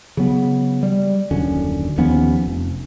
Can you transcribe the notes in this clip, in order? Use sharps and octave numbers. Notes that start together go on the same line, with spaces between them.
C#3 F#3 B3
G3
D#1 F#2 D3 C#4
D#2 F3 B3 C#4
F1